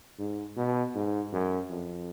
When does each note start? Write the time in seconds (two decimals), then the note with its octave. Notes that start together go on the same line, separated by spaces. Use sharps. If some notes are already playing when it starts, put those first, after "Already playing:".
0.19 G#2
0.57 B2
0.95 G#2
1.33 F#2
1.70 F2